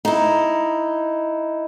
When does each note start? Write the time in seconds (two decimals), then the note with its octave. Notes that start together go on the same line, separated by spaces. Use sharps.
0.05 D#4 E4